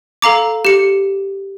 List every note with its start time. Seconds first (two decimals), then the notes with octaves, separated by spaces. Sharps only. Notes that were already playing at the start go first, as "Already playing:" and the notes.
0.22 A4 F5 A#5 D6
0.65 G4 C#7